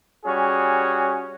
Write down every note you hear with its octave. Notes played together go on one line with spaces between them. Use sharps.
G3 C#4 F#4 G#4